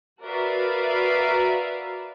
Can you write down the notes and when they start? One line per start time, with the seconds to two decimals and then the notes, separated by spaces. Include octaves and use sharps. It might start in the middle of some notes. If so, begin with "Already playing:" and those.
0.22 F#4 A#4 B4 D5 E5 F5